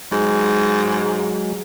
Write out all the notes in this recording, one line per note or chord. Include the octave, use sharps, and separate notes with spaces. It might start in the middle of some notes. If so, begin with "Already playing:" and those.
G#2 F#3 G#3